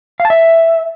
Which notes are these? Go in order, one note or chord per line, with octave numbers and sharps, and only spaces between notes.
F5
A5
E5